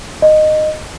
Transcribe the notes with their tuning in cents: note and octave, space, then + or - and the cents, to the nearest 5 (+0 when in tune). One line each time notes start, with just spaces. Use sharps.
D#5 -10